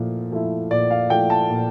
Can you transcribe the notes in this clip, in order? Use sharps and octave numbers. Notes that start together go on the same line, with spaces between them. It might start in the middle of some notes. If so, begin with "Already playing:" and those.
Already playing: A#2 F3 A3 E4
F3 A3 E4
A#2 D5
F5
F3 A3 E4 G5
A5
A#2